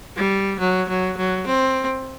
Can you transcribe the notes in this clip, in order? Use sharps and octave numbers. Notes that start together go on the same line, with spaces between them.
G3
F#3
F#3
F#3
C4